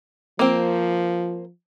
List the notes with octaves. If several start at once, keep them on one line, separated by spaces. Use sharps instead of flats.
F3 A#3 C4